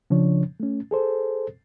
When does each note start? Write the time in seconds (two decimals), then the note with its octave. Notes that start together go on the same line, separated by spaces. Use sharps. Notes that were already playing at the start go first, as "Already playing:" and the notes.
0.10 C#3 F3 D4 C#5
0.60 A3 C#4
0.91 G#4 A4 C5